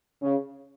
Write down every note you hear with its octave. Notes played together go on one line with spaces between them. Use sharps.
C#3